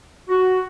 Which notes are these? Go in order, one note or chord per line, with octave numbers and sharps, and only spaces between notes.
F#4